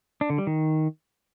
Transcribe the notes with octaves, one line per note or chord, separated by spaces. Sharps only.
D4
D3
G3
D#3